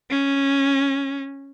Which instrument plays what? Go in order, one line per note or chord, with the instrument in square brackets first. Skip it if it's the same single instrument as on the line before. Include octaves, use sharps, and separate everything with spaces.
[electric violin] C#4